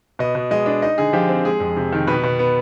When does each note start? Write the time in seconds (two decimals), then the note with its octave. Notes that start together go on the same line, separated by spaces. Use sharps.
0.19 B2 D#5
0.35 B2
0.51 G#3 D#5
0.66 D4
0.82 D#4 D#5
0.98 D3 G#4
1.13 F3 G4
1.29 C4
1.45 G#3 G#4
1.60 F2
1.77 C3
1.92 D#3
2.07 B2 B4
2.23 B2
2.39 B3